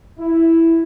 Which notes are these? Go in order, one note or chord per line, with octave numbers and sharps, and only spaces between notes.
E4